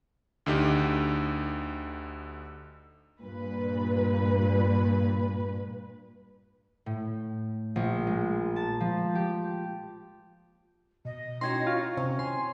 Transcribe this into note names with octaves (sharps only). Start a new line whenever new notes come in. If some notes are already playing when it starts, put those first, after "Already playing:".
D2 D3 D#4 G4
G2 A#2 B4
A2
A#1
G#3
A5
F3
G4
B2 D#5
C#4 D#4 E4 F#4 G5 C6 G#6
F4 C#6
C3 C#4
G#5 C6